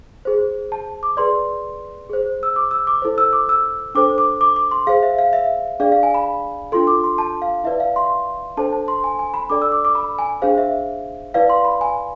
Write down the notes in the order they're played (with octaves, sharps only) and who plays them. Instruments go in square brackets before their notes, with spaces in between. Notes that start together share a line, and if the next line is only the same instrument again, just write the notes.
[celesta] G#4 C5
A5
D6
G#4 B4 D5 C6
G#4 C5
E6
D6
E6
D6
E4 A4 C5
E6
D6
E6
D4 A4 C5 D6
D6
D6
D6
C6
G#4 C5 F5
E5
F5
E5
D4 G#4 D5 F5
F5
G#5
B5
D4 F4 A4 C6
D6
C6
A5
F5
E4 B4 D5 E5
F5
C6
D4 A4 C5 A5
A5
C6
G#5
G#5
B5
D4 A4 D5 D6
E6
D6
D6
B5
G#5
D4 G#4 C5 F5
E5
E4 B4 D5 F5
C6
B5
G#5